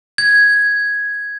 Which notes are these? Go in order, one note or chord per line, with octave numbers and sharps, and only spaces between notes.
G#6